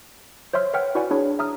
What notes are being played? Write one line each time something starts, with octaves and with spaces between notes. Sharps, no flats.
C5 C#5 E5 C6 F6
B4 C#5 E5 F#5 G5 F6
E4 F#4 B4 D5 F#5 G#5
D4 E4 G#4 C#5
E5 A#5 D#6 F6